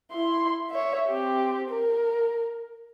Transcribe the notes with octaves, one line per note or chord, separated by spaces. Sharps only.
E4 C6
C#5 E5
C4 G4
A#4